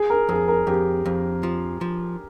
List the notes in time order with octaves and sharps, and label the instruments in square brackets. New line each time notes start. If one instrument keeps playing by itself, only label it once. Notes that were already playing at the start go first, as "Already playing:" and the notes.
Already playing: [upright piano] G#4
A#4
[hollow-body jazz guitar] F2 [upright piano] G#4
[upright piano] A#4
[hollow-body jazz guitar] F2 [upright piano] G4
[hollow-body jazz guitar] F2
F3
F3